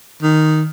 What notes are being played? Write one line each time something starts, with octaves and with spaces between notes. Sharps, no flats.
D#3